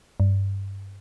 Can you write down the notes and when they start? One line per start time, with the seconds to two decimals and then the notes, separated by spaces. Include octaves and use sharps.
0.20 G2